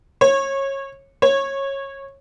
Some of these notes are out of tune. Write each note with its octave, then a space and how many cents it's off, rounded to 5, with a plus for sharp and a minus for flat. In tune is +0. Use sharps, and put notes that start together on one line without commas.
C#5 -25
C#5 -20